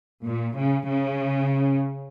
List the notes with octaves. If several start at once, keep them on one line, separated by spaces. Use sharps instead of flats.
A#2
C#3
C#3